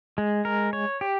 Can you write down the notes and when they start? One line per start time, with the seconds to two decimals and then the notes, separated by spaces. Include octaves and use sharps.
0.18 G#3
0.45 A#4
0.73 C#5
1.01 G4